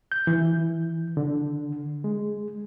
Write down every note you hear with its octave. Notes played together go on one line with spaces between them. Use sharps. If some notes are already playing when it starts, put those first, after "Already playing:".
G6
E3
D3
G#3